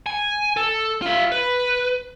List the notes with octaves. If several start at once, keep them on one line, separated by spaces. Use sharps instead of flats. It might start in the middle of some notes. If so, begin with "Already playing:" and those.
G#5
A4
F4 E5
B4